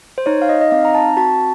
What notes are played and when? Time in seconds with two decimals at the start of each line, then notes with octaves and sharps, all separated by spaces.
0.18 C5
0.26 D#4 C#5
0.42 F5
0.49 D#5
0.61 D#5
0.71 C4 F5
0.85 A#5
0.94 A5
1.17 F#4 A5